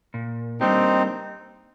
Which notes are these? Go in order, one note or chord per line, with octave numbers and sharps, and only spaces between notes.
A#2
G3 A#3 C4 D4 D#4 G4